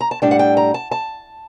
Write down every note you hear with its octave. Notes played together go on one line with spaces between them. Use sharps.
A#5
A5
A2 G3 D4 G5
F#5
G5
A#5
A5
A5